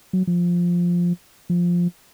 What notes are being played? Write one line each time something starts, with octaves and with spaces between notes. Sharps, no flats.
F#3
F3
F3